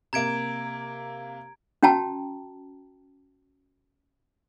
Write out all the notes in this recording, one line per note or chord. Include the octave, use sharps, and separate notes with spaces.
C3 A#3 A#5 G#6 D7
C#4 F#4 G5 A5 A#5